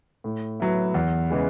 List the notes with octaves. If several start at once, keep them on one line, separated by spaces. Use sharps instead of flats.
A2
F#3 B3 E4
E2
C#3 E3 G#3